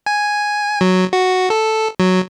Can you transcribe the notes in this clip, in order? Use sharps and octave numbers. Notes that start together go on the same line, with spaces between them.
G#5
F#3
F#4
A4
F#3